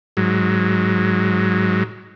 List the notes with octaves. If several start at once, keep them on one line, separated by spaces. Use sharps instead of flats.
G#2 F#3